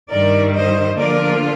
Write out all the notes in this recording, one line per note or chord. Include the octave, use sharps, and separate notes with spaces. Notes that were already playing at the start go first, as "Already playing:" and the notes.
G2 D#3 G3 A#4 D5
C5 D#5
D3 F3 A#3 D4 F4 A#4 D5